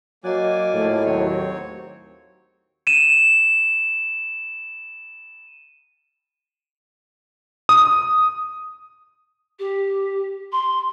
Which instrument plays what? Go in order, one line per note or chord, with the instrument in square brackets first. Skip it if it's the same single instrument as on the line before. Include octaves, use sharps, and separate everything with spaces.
[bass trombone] F#3 [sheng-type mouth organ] A#3 D5 G#5 [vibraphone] F#4 D#5
[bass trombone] A2 [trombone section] F3 A3
[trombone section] D#2 F#3 [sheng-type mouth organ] C4 C#5
[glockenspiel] D#7 E7
[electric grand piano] D#6
[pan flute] G4
C6